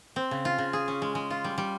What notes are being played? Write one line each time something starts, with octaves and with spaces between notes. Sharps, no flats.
C4
C#3
F4
C#3
G#4
C#4
G#3
G#3
F4
G3
G3